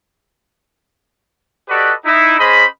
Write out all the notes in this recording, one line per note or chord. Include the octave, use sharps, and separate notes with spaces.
F#4 G4 A4 B4 D5 D#5
D#4 E4
C#4 G#4 C5 D#5 B5